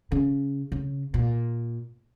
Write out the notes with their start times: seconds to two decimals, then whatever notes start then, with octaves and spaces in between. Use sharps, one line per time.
0.12 C#3
0.72 C#3
1.14 A#2